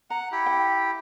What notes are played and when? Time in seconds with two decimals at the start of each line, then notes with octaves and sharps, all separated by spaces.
0.10 F#5 A#5
0.32 E4 G4
0.46 G5